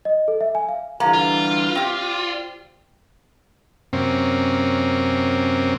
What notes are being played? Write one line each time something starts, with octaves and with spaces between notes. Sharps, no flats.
D#5
A4
E5
G#5
F5
D3 E3 G3 A#3 A#5
F4
C4 G4 D5
F#2 C3 A#3 C4 C#4